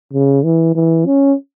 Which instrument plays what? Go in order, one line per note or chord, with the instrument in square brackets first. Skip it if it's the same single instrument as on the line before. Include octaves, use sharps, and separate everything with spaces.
[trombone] C#3
E3
E3
C#4